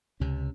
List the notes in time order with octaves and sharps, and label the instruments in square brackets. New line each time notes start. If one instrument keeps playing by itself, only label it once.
[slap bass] C#2 C3 C#4